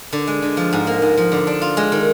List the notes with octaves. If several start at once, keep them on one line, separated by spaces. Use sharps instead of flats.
D3
G#3
D3
F3
G#2
A#3
G#2
F3
D3
D4
F4
G#3
D#3